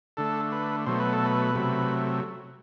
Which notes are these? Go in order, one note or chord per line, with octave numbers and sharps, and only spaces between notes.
D3 A3 A4
B4
B2 F#3 A3 C5
B4
A4
B4
C3 F#3 A3